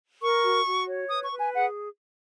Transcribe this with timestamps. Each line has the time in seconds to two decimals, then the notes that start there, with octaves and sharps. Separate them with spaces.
0.22 A#4 C#6
0.43 F#4
0.65 F#4
0.87 C#5
1.10 B4 D#6
1.24 C#6
1.32 B4
1.40 G#5
1.54 G#4 F#5